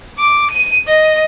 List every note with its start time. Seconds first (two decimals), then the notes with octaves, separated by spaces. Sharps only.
0.18 D6
0.51 D#7
0.88 D#5